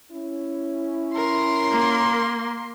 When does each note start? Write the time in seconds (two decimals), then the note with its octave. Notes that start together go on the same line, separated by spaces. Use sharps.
0.12 C#4 E4
1.15 A#4 C6
1.71 A#3